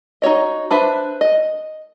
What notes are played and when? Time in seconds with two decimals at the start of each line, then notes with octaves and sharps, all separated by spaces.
0.22 D#4 F#4 C#5 D#5
0.71 D4 B4 C5 E5
1.21 D#5